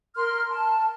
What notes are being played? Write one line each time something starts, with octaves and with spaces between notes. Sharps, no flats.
A#4 C6 F6
A5